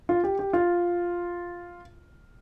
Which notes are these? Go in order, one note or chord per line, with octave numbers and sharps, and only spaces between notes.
F4
G4
G4
F4